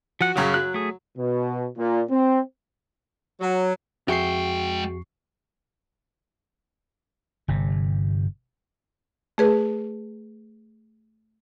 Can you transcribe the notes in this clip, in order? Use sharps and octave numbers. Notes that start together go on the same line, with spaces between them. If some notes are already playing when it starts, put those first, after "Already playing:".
F3 F#4 F#5
F#2 C#3 F#3 F#4
F#3 F#6
A3 G#4
B2
A#2
C4
F#3
F2 G#3 F#4 G#4 E5 G5 C#6 C7
G1 C3
A3 G#4 B4